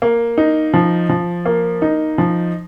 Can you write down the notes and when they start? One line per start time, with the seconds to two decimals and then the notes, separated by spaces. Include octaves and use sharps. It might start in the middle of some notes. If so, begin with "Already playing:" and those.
0.02 A#3
0.38 D#4
0.74 F3
1.09 F3
1.46 A#3
1.82 D#4
2.18 F3